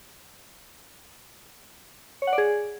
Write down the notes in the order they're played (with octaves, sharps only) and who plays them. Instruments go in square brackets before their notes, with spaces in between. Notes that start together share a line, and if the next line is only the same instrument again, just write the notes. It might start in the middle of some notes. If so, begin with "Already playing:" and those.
[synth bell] C#5
F#5
D5
G#4